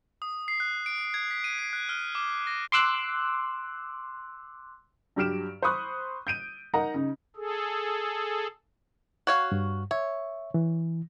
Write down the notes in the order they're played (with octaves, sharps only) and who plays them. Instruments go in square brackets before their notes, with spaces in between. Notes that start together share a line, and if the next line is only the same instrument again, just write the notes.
[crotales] D#6
C7
F#6
D7
G#6
B6
D#7
C7
F#6
F6
D6
A#6
[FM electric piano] C6 D6 E6 F#6
[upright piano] G2 F#3 G4 F6 D7 E7
C5 B5 C#6 D#6 F#6
G6 D7 D#7
D#4 A#4 D#5 F#5 A#5
C#3 D#4
[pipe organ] G#4 A4
[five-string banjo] F#4 C#5 F5
[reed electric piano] G2
[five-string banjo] C#5 [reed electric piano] E5
[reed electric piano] E3